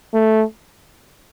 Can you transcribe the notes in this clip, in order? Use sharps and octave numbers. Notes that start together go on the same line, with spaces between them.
A3